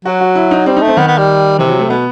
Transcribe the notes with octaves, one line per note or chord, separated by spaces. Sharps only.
F#3 F#4
F#4
E4
D#4
G3 C4
D#4
A3
C4
D#3 B3
B3
G3
C3 E3
F#3
A3
B2 B3